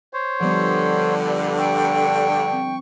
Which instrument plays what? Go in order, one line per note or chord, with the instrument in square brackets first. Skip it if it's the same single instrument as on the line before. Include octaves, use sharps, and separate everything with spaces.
[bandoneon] C5 C#5
[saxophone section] G2 D3 [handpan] F3 G3 B3
[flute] G5 [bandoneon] C#6
[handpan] C4